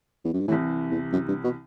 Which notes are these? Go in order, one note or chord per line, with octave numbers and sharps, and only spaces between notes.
E2
F#2
G2
C2 A2 C3 E3
E2
F#2
G2
B2